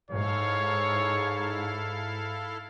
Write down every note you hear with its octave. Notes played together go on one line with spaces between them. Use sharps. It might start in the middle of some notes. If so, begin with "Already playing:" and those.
G#2 E4 A4 C#5 F5